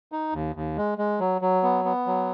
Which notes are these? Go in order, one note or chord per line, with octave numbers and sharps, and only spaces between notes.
D#4
D#2
D#2
G#3
G#3
F#3
F#3
B3
B3
F#3